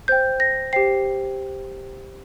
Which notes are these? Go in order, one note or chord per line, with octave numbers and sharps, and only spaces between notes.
C5 G5 G6
A#6
G4 C5 G5 C7